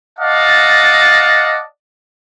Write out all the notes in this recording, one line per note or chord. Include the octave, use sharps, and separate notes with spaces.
D5 D#5 F5 F#5 A5